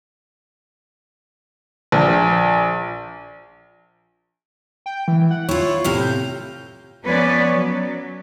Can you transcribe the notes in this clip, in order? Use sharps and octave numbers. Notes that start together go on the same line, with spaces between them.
A#1
G5
E3
F#5
E4 F4 C#5
A2 C3 F5
G6
F3 B3 C#4 B4 C#5 D5
F#3